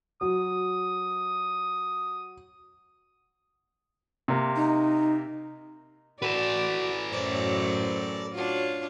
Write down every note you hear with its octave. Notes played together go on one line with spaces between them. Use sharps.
F#3 D#6
C3 A#3
D#4
F#4 A4 B4 D5
F#2 A2 F#3 C5 D5
D4 F4 F#4 C#5